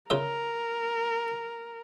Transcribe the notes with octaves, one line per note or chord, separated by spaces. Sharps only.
C#3 F4 A#4 E5